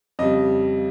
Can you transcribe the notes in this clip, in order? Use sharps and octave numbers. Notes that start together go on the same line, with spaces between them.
F2 C#3 G3 D#5